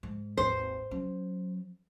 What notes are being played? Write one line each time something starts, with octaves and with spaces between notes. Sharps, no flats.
G#2
G#1 D#2 C5
F#3 C#4